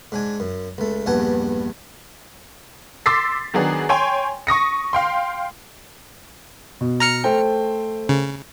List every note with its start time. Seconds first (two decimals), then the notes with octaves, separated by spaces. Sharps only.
0.12 G#2 D4 G#5
0.40 F#2
0.78 C#2 A3
1.06 A#1 E2 G2 F#5 G#5 A5
3.06 C6 D6 E6 A6 B6 C7
3.54 D#3 F#3 B3 D4 G#4
3.89 C#5 G5 G#5 C6
4.47 C#6 D#6 A#6 C#7
4.93 F5 G5 C6
6.81 B2
7.00 A#5 F6 C#7
7.24 A3 C5 G5
8.09 C#3